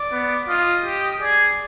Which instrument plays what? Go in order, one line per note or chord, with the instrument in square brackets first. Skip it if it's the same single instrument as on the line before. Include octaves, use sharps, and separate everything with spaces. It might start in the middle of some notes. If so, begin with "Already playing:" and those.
Already playing: [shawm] D5
[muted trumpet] B3
[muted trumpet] F4 [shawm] D#5
[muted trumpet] G4
[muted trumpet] G#4 [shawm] D5